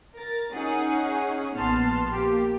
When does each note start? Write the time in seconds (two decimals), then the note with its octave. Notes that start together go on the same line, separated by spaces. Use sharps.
0.17 A#4 A6
0.52 C#4 D#4 G#4 F#5
1.55 A#1 B3 A5 C6 F6 C7
2.11 A#3 G4